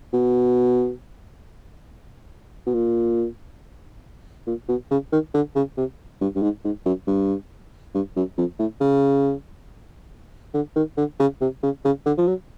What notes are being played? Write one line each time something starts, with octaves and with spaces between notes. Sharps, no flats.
B2
B2
A#2
A#2
B2
C#3
D#3
D3
C#3
C3
G2
G2
G#2
G#2
F#2
G2
G2
F#2
F2
A2
C#3
D3
D#3
D3
C#3
C3
C#3
C#3
D3
F3
F#3